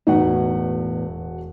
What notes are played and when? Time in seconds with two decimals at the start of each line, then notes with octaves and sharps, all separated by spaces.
0.07 E1 E2 A2 D#4 F#4 F#5